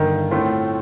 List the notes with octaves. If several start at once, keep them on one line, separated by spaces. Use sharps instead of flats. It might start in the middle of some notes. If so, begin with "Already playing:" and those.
Already playing: G1 G2 D3 D#3
A2 A3 C4 F4